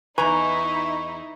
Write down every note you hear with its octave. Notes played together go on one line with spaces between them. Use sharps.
E2 D#4 E4 B4 G#5 A#5 C#6